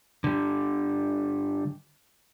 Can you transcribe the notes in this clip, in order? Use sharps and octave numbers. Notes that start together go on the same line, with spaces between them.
D3 G3